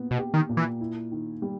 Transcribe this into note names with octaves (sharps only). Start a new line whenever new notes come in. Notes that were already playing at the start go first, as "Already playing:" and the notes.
Already playing: A#2 B3
B2
G4
D#3
A#2
E3
E4
D#3
G3